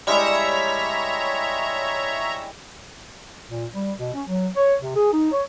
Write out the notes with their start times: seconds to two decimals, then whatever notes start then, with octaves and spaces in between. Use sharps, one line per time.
0.07 G3 G#3 E4 C#5 E5 A#5
3.49 A#2
3.73 G3
3.99 B2
4.14 C#4
4.27 F#3
4.56 C#5
4.82 C3
4.96 G#4
5.12 D#4
5.32 C#5